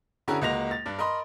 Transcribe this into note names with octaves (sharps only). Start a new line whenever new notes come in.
D3 C#4 E4 F#4 G#4 A#4
C#2 G#3 A#3 F#4 A#6 F7
A6
G2 D4
A#4 D#5 B5 C6